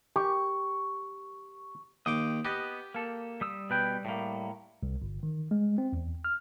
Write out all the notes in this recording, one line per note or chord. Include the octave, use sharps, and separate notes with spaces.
G4 C#6
D#2 G5 D6 D#6
B3 G4 D#5
A#3 A4
G3 D#6 E6
B2 B4 G5
A2 A#3
C2
G1
D#3
G#3
C4
E2
F6